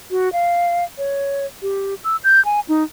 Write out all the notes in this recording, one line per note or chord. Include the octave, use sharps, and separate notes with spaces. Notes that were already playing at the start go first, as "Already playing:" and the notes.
F#4
F5
C#5
G4
E6
G6
G#5
D#4